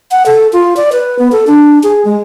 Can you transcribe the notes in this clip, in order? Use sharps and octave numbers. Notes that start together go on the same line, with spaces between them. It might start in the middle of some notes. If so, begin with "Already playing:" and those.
F#5
A4
F4
D5
B4
B3
A4
D4
G#4
G#3